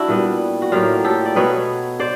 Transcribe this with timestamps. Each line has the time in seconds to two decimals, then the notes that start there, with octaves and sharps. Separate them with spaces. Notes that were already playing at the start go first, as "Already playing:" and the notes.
Already playing: D4 E4 F#4
0.08 A#2 G3 B3
0.62 F#4
0.72 A2 F#3 A#3 F4 G4
1.04 G4 A4
1.25 D5
1.35 B2 F#3 B3 B4 C#5
2.00 C5 D5